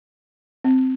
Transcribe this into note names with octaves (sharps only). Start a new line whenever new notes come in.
C4